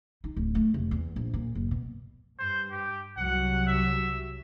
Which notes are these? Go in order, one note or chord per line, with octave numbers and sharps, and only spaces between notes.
D#4
D1
A3
F1
E2
A#1
A#2
F#1
B2
G2 C5
G4
C2 F#3 F#5
E5